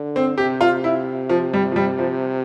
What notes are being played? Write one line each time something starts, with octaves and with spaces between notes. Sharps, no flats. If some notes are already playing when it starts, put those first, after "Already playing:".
Already playing: D3
C4
C3 G4
F4
E4
F3
G3
F3
G3
F3